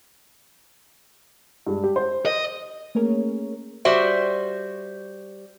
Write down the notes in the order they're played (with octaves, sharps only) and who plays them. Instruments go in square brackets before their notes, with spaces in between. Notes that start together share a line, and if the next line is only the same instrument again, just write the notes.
[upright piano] G2 G#3
G4
C5
[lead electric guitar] D#5
[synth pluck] A3 A#3 C#4 G#4 A#4 C#5
[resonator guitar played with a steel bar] G3 F#4 C5 E5